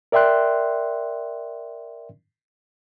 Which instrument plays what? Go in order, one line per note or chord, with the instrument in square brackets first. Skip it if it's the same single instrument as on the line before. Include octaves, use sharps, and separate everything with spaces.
[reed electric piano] A#4 D5 E5 G5 C6 F#6